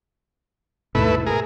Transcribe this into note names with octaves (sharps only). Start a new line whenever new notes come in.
D#2 G#2 B2 A3 E4 B4
G#4 A#4